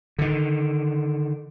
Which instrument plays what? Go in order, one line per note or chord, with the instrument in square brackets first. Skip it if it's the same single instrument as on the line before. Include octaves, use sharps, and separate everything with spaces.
[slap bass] D3 D#3